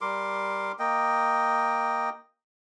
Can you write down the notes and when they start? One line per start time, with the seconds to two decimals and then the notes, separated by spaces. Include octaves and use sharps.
0.01 G3 A#4 C6 D6
0.79 A#3 D#5 G5